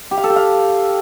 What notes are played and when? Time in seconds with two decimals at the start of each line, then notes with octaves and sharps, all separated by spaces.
0.11 G4
0.17 F5
0.24 A4
0.30 G4
0.36 F5